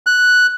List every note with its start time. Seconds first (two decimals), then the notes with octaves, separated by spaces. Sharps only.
0.07 F#6